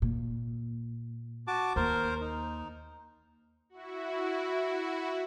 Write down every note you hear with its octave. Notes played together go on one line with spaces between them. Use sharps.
A#2
F#4 A5 D6
D#2 A#4 C5
D#4
E4 F#4